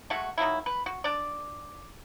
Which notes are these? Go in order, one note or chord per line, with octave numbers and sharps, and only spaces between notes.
G#3 A3 F#4
D#3 F#3 A#3 E4
B4
F#4
D4 D5